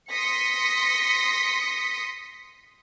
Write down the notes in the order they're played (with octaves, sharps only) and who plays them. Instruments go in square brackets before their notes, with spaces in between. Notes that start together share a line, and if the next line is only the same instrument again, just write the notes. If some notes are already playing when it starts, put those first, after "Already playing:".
[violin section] C6 D#6 A#6 B6 C#7